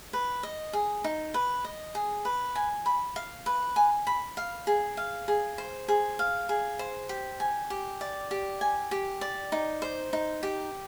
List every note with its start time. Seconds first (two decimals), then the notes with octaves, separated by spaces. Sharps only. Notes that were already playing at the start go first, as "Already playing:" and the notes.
0.13 B4
0.43 D#5
0.73 G#4
1.04 D#4
1.34 B4
1.65 D#5
1.95 G#4
2.25 B4
2.55 G#5
2.86 B5
3.16 F5
3.46 B4
3.76 G#5
4.07 B5
4.37 F5
4.67 G#4
4.97 F5
5.28 G#4
5.58 C5
5.88 G#4
6.19 F5
6.49 G#4
6.79 C5
7.09 G4
7.40 G#5
7.70 G4
8.01 D5
8.31 G4
8.61 G#5
8.91 G4
9.21 D5
9.52 D#4
9.82 C5
10.13 D#4
10.43 G4